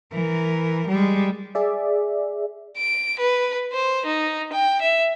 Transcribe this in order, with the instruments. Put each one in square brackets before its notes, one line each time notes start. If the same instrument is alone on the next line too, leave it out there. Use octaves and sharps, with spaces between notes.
[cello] E3 A#4
G3 G#3
[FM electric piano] G#4 D5 E5
[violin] D7
B4
C5
D#4
G5
E5